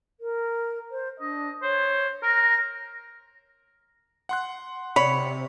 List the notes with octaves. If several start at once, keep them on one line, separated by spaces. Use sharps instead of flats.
A#4
C5
D4 D#5
C5 C#5
A#4 A#6
F#5 C6 F#6
C3 C#5 B5